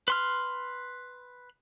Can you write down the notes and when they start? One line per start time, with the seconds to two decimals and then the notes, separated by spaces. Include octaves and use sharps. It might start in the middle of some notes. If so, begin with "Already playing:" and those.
0.08 B4 C6 F6